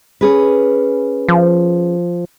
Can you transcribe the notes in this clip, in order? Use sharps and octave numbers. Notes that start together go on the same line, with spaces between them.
C#4 G#4 B4
F3